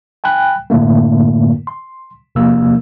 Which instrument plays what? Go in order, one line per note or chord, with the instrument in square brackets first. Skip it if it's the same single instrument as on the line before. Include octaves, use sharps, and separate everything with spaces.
[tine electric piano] G5 G#5 B5 F#6
F#2 A2 D3 A3 A#3
C6
E2 C3 F3 A#3 E6